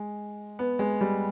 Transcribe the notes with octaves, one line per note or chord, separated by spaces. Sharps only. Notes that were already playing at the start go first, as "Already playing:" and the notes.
Already playing: G#3
B3
G#3
G3